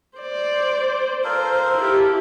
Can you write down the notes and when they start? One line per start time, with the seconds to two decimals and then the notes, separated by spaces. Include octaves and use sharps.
0.18 C5 D5
1.24 F4 A4 A#4 C5
1.77 E4 G4